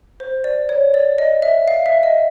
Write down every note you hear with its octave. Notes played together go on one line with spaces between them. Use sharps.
C5
D5
C#5
D5
D#5
E5
F5
E5
D#5